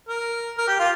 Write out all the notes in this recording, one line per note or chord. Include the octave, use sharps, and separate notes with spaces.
A#4
A#4
G4
F4